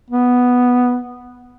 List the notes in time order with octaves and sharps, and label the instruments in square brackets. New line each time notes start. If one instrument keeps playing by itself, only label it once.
[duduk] B3